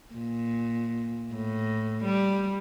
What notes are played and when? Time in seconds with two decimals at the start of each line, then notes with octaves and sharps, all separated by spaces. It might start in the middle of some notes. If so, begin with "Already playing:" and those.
0.15 A#2
1.34 A2
2.04 G3